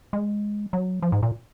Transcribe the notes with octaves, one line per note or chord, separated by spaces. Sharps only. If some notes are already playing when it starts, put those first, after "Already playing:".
G#3
F#3
F3
G#2
A#2